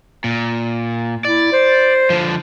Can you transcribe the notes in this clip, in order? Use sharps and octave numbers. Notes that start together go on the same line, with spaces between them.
A#2
E4 D5
C5
D3 F3